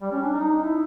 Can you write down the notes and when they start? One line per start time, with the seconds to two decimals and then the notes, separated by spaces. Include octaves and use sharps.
0.02 G3
0.12 C#4
0.22 D4
0.32 D#4
0.64 E4